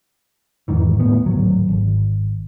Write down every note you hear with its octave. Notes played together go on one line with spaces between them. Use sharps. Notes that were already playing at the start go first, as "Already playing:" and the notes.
E2 G#2 D#3 E3
A2 B3
D1 G#1 F#3
G#1